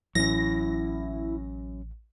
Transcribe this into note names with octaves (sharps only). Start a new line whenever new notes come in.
A1 F#3 C#4 E4 A#6